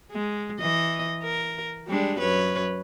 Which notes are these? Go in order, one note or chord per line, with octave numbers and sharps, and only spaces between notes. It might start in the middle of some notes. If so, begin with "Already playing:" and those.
G#3
E3 D#5
A#4
G3 G#3 D4
F#2 B4 C#5